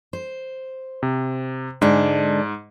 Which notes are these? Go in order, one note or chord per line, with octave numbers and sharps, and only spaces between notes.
C5
C3
G#2 D3 G#3 D4